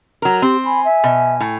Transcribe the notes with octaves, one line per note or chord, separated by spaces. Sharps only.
F#3 A#4
C4 G4
G#5 B5
E5
B2
A2